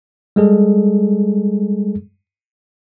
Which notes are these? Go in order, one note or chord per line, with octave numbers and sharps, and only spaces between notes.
G3 G#3 G#4 A4